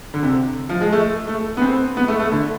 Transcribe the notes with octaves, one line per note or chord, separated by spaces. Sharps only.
D3
C3
F3
G#3
A3
A3
B3
C4
B3
A3
A3
D3